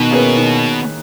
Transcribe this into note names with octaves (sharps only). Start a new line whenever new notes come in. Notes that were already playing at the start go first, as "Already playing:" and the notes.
Already playing: B2 D#3
A#3 C#4 G#4 B4
D#3